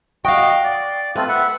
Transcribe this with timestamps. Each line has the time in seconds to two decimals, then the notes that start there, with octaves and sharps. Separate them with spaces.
0.25 F#4 D#5 F5 G5
0.64 D5
1.16 A3 C4 F4 B4
1.29 E5 F#5 B5